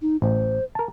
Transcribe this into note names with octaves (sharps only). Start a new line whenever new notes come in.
D#4
A1 C5
A#4 A5